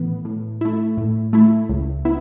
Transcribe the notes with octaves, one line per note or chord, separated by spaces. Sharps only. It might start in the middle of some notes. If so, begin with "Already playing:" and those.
Already playing: A2 E3 B3
A2
A3 E4
A2
A3 E4
C#2
B3 E4